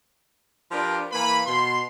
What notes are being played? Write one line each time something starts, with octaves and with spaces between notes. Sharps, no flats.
F3 D4 G4 A#4 B4
E3 A#3 B4 B5
B2 C6